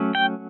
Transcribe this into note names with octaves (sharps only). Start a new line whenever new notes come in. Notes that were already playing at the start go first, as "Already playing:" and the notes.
Already playing: F#3 A3 C#4
G5